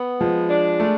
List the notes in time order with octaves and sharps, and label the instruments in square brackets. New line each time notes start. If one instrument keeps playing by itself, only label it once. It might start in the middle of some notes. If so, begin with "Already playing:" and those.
Already playing: [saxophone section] B3
[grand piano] F3 [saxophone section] G#3
[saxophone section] D4
[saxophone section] G#3 [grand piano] A3